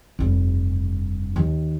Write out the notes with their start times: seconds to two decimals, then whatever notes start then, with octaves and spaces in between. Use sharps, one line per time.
0.19 F1 G2
1.36 D#2 D#3